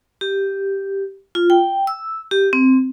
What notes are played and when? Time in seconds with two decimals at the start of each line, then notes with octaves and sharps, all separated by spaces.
0.21 G4
1.35 F4
1.50 G5
1.87 E6
2.31 G4
2.53 C4